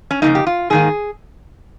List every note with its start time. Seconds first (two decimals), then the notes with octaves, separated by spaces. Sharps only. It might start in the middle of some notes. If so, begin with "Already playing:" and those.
0.11 C#4
0.22 F2 C#3 F3 A#3 D#4
0.35 G4
0.47 F4
0.70 G#2 D#3 A#3 G#4